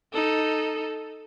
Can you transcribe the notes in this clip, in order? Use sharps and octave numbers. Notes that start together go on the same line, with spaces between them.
D#4 A4